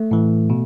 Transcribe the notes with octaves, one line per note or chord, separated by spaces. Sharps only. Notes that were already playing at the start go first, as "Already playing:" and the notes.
Already playing: A3
A2 E3
B2